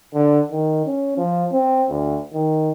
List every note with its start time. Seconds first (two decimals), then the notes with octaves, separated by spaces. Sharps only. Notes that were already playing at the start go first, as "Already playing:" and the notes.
0.14 D3
0.51 D#3
0.86 C#4
1.18 F3
1.52 C4
1.90 D2
2.33 D#3